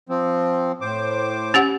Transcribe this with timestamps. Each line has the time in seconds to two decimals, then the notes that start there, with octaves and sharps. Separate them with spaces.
0.09 F3 C4
0.81 A2 C5 D6
1.54 C#4 G4 F#5